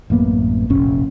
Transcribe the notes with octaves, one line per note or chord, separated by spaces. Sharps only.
A1 F#2 A#3 B3
F1 A#1 C#4